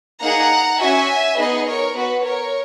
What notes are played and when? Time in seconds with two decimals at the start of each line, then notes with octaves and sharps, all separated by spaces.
0.21 A#3 D#4 G#4 F#5 A#5
0.79 C#4 F#4 E5 G#5
1.37 B3 D#4 G#4 B4 D#5
1.66 A#4 C#5
1.95 B3 F#4 B4
2.24 A#4 C#5